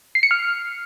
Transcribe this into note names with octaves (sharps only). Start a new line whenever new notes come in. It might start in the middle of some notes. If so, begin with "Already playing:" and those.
C7
C#7
F6